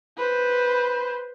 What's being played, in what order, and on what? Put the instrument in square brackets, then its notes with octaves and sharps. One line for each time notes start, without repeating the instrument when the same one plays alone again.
[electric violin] B4 C5